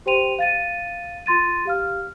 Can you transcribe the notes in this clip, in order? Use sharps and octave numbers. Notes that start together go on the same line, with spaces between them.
G4 C5 G5 C6 D#7 F7
F5 A6 D#7
F4 C6 A6 D#7
G4 F5 F6